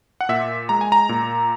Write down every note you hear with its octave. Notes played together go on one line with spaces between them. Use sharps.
F#5
A#2 E5
G#3 A#5
G#5
A#5
A#2